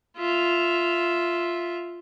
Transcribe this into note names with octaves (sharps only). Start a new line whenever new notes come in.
F4 E5